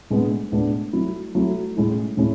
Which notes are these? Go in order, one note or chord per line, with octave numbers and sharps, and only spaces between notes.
A2 G#3 B3 D4
A2 G#3 B3 D4
F#3 A3 E4
F#3 A3 E4
A2 G#3 C#4 E4
A2 G#3 C#4 E4